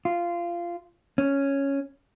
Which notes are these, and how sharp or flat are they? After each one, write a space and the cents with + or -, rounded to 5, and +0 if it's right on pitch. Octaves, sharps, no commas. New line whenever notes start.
F4 -15
C#4 +0